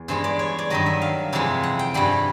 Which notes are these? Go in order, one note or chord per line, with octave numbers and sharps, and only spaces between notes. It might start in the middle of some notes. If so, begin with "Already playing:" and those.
Already playing: E2
G2 E3 G#3 C5
D5
C#5
D5
G2 D#3 F#3 D#5
E5
F5
F2 C3 E3 G#3
F#5
G5
G2 E3 G3 F#5